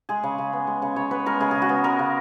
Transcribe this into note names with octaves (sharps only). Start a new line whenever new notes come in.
G#3 G#4
C#3
C#3
B3
G#3
C#3
C#3 C#5
B3 B4
G#3 A#4
C#3 G#4
C#3 G#4
F#4
B3
G#3 A#4
C#3